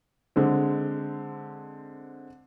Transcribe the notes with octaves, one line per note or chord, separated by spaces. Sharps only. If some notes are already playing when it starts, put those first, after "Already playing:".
D3 G#3 C4